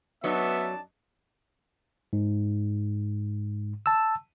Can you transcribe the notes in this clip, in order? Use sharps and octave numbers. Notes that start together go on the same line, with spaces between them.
F#2 F#3 B3 D#4 D5 E5 A5
G#2
A5 E6